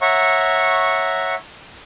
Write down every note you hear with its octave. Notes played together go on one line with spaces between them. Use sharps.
C#5 E5 F#5 A#5 C#6